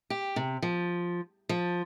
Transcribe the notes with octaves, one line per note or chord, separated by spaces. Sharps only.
G4
C3
F3
F3